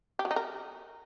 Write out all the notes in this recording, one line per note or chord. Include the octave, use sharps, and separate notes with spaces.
G4
F#3
D#4
A#4